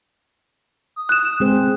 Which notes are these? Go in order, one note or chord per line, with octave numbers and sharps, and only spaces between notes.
D#6
F#6 E7
G#3 C4 G#4 C5